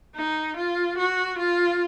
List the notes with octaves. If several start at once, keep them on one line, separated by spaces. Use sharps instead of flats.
D#4
F4
F#4
F4